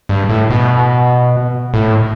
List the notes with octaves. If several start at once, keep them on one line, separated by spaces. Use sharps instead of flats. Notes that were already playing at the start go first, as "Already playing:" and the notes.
G2
A2
B2
A2